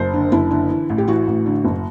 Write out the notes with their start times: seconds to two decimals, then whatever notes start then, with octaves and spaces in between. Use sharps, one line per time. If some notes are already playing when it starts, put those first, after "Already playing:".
Already playing: F#1 C5
0.14 D3
0.32 F#1 E4
0.51 D3
0.70 E3
0.90 A1
0.98 G4
1.07 E3 F#4
1.27 A1
1.46 D3
1.65 F#1